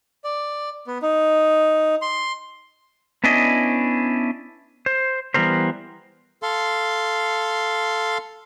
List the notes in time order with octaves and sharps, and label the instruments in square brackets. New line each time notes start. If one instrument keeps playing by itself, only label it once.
[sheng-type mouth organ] D5
B3
D#4
C6
[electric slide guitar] B3 C#4 D4 E4 D#5
C5
E3 G3 B3 A#4 C5
[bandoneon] A4 F5 C6